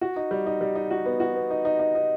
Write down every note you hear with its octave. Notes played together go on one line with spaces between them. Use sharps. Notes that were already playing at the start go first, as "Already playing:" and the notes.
F#4
D#4
G3
D#4
G3
D#4
F#4
B3
F#4
B3
D#4
D#4
D#4
D#4